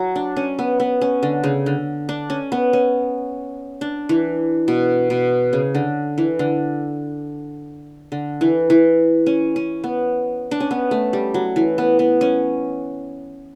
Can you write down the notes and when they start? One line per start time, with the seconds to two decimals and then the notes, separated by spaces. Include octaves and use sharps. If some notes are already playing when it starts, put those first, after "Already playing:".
Already playing: F#3
0.16 D4
0.36 C#4
0.59 B3
0.80 B3
1.01 C#4
1.23 D3
1.44 C#3
1.66 D3
2.09 D4
2.30 C#4
2.52 B3
2.73 C#4
3.81 D4
4.09 E3
4.68 B2
5.10 B2
5.53 C#3
5.75 D3
6.18 E3
6.39 D3
8.12 D3
8.41 E3
8.70 E3
9.26 C#4
9.56 C#4
9.84 B3
10.51 D4
10.60 C#4
10.71 B3
10.91 A3
11.13 G3
11.34 F#3
11.56 E3
11.78 B3
11.99 B3
12.21 C#4